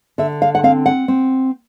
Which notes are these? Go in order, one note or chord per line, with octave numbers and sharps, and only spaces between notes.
D3 E5
F5
F#5
C4 F5
F#5
C4